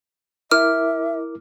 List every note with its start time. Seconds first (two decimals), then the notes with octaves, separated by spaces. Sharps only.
0.51 E4 A#4 E5 D6 F6